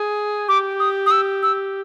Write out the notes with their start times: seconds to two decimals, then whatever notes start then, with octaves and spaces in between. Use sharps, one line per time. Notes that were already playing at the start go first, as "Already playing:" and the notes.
Already playing: G#4
0.48 G4 D6
0.80 D#6
1.06 D#6
1.11 E6
1.43 E6